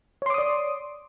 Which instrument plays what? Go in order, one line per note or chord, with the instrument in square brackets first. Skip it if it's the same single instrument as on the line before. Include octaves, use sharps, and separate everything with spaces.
[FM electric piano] C#5
C6
D6
D#6
D5